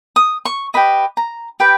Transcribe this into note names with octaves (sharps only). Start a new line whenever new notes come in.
D#6
C#6
G4 B4 D#5 B5
A#5
G4 B4 G5